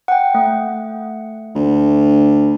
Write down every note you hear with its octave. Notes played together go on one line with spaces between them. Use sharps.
F#5 G5
A3
D2